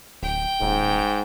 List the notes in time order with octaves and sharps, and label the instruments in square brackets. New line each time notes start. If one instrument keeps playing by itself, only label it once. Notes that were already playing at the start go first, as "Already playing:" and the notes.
[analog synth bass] D1 [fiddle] G5
[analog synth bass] D#1 [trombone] G#2